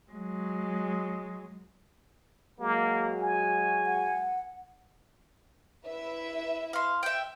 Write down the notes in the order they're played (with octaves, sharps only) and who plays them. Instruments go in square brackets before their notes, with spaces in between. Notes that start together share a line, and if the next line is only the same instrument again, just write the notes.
[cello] F#3 G#3
[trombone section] F#3 G#3 F#4 [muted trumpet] A#3
[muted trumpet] G#5
[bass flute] F#5
[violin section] E4 B4 E5
[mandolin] F5 C6
E5 G5